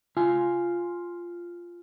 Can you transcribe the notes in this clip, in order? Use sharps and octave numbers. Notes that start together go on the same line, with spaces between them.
F4 G#5